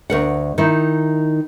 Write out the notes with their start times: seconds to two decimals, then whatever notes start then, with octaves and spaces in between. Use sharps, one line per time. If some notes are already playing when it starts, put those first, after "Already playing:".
0.10 D2 A#4 F#5
0.58 D#3 D#4 E4